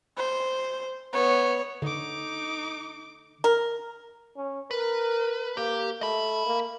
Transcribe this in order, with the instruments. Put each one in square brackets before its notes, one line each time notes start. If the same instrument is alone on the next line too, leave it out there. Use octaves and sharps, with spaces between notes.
[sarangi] C5
[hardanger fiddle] B3 [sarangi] C#5
[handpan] D3 [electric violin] D#4 D6
[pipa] A#4
[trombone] C#4
[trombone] A#4 [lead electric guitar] B4
[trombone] A#3 [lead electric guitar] G4
[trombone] A3 [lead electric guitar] D#5 B5
[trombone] A#3